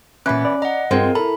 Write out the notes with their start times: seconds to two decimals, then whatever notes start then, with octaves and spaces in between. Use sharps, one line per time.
0.26 A#2 E3 B3 C#4 B5 F#6
0.45 D5
0.62 D#5 F#5 A#5
0.91 G2 G#3 C4 F4 A#4
1.15 E4 A4 A#5 B5